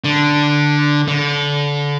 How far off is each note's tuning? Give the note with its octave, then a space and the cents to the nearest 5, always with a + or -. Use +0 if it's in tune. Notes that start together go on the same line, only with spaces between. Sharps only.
D3 +0
D3 -25